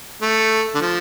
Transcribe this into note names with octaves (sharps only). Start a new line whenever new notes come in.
A3
D3
F3